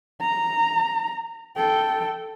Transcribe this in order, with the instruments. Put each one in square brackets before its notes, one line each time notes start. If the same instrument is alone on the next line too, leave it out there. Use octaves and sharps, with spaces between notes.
[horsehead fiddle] A#5
A4 G5